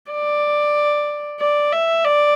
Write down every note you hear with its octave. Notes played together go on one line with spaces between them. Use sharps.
D5
D5
E5
D5